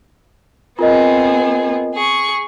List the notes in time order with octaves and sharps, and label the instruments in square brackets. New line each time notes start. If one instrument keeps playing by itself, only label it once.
[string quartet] B3 C4 G#4 [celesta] F4 A#4 D#5
[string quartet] G#4 C#6